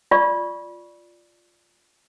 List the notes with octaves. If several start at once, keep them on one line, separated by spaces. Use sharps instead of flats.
F4 D5 C#6